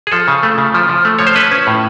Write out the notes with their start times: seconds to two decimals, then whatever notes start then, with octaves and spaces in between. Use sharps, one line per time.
0.07 G#4
0.12 F3 A4
0.28 C#3
0.43 A3
0.58 C#3
0.74 F3
0.89 F3
1.05 A3
1.19 F3 C#5
1.27 C5
1.35 C#4 B4
1.51 C#4
1.67 A2